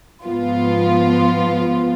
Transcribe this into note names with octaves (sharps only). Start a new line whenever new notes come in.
G#2 F3 B3 F4